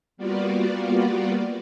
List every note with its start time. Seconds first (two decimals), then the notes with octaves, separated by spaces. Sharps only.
0.17 G3 A#3 B3 F4 F#4 D5